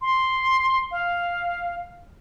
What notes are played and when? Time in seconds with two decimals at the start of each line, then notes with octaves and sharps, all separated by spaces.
0.01 C6
0.91 F5